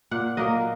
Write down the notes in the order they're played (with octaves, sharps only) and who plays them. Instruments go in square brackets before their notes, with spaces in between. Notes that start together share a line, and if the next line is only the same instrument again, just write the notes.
[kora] A#2 F#5
F#3 A#3 D#5